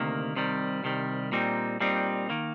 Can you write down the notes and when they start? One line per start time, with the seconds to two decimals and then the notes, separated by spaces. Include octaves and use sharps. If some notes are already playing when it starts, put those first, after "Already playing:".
Already playing: D2 C3 D#3 A#3
0.35 C2 C3 D#3 G3
0.84 C2 C3 D#3 G3
1.32 A#2 G3 C4 D#4
1.80 A#2 G3 C4 D#4
2.30 D#3 A#3